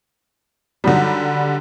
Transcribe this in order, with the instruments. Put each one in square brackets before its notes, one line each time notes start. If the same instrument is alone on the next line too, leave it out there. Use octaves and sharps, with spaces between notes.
[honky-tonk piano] D3 G3 [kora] D#3 F#3 D#4